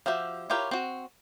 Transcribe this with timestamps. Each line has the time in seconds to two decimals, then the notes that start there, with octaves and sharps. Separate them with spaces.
0.06 F3 F#4 G4 E5
0.50 E4 F4 G4 A#4 C#5
0.71 C4 F#4